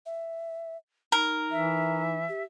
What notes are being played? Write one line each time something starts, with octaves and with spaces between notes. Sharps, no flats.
E5
D#4 A#4
E3 E5
G4